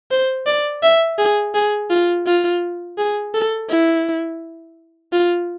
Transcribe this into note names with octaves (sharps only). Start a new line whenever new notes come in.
C5
D5
E5
G#4
G#4
F4
F4
G#4
A4
E4
F4